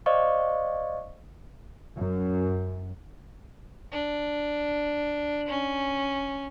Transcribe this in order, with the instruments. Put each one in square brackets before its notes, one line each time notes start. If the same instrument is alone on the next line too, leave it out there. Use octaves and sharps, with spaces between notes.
[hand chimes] C5 D5 D#5 F5 C#6
[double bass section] F#2
[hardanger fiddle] D4
C#4